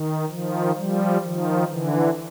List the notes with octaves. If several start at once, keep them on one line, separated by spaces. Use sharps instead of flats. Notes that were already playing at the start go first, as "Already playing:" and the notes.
Already playing: D#3
D#3 F3
F3 G3
D#3 F3
D3 E3